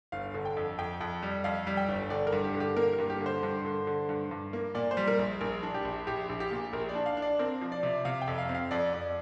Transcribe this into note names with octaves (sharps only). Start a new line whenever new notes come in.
G1 F5
D3
G5
F2
F2 G5
F2
G3
F2 F5
G3
G5
G1
D3 D5
A#4
G2
G4
D3
G4
A#3 A#4
A#4
G2
G4
D3
C5
G2
D3
D3
G2
G2
A#3
A#2 D5
C5
G3
A#4
A#1
A#1 A#4
D4
G4
A#1
A#1 G4
A#1
G4
A#2
A#1 A#4
D5
D4
F5
D4
D5
C4 A#4
F3
D5
C3
C3 F5
G5
F2
F5
C4
F5
F2 D5
F2 D5